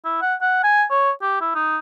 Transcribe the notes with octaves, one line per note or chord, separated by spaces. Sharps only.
E4
F#5
F#5
G#5
C#5
G4
E4
D#4